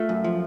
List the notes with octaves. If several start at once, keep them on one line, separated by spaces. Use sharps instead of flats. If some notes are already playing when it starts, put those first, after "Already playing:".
Already playing: A3 F4
F#2
F3